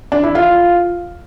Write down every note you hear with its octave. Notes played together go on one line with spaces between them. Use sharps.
D4
E4
F4